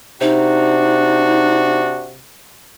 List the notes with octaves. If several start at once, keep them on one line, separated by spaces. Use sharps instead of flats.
C3 D4 D#4 F#4